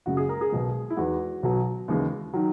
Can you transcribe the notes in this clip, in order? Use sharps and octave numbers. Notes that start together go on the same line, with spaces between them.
F#1 F#2 C#3 G#3 F#4
G#4
A#4
G#4
B1 B2 G#3
E4
E2 D#3 G#3 F#4
B1 B2 F#3
D#2 C#3 E3 G#3
D#3 F#3